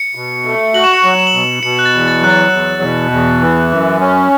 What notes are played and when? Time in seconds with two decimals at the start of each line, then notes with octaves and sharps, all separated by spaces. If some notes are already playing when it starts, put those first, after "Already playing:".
Already playing: C#7
0.15 B2
0.45 A3
0.74 F#4 F#7
0.84 E7
0.93 C#7
1.04 F#3 E7
1.19 E7
1.27 F#7
1.34 B2 E7
1.63 B2 C#7
1.79 F#6
1.85 A6
1.93 E2
2.08 A6
2.22 F#3 F#6
2.30 A6
2.52 E2
2.82 B2
3.11 E2
3.41 E3
3.71 F#2
4.00 C#4